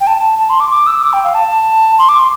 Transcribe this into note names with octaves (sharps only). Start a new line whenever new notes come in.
G5
A5
A5
C6
D6
D6
E6
D6
G5
F5
A5
C6
D6
C6